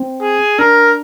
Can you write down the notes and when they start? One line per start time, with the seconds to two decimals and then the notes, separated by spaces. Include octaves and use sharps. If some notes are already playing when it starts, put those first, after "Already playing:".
Already playing: C4
0.22 G#4
0.59 D4 A#4